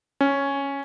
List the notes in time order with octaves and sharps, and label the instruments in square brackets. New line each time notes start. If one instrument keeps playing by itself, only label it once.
[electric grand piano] C#4